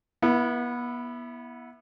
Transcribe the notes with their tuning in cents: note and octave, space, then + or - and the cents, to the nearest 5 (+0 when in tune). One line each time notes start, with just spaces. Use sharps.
B3 -30 E4 +0